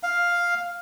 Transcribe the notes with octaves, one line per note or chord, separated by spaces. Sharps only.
F5